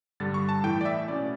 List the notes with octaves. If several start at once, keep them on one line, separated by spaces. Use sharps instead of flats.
G2 D3 G3 A6
C#6
A5
A2 E3 A3 E4 G5
D5
E5
B2 A3 C#4 E4 D5